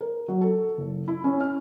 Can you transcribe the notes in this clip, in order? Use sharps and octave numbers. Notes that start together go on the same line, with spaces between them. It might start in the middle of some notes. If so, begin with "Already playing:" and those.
A#4
F#3
A4
F#1
E4
C#4
F6